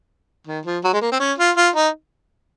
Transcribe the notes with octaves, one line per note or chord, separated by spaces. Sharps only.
D#3
F3
F#3
G#3
A#3
C4
C#4
F4
F4
D#4